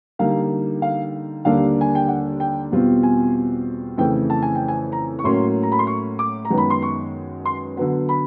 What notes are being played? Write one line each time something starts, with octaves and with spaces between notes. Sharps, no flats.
D3 G3 A#3 D#4 F5
F5
D#2 D3 G3 A#3 D4 F5
G#5
G5
F#5
G5
E2 B2 G3 C4 F4
G#5
F2 C#3 E3 A3 G5
A5
G#5
G5
G#5
A#5
C#6
A2 F#3 A#3 C#4 C6
A#5
B5
C6
C#6
D6
A#5
F#2 D#3 G#3 B3
B5
C6
C#6
C6
D3 F#3 B3
B5